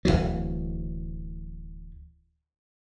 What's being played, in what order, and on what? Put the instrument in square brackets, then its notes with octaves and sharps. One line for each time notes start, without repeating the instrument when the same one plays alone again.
[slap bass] D1 A#1 E3 F#3